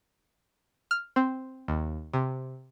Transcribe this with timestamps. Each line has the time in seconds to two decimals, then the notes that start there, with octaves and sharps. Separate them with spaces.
0.91 F6
1.16 C4
1.68 D#2
2.14 C3